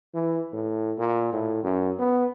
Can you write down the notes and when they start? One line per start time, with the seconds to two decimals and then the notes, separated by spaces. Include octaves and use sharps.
0.14 E3
0.53 A2
0.98 A#2
1.33 A2
1.63 F#2
1.99 B3